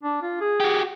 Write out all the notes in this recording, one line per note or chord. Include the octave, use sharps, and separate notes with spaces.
D4
F4
G#4
F#4 G4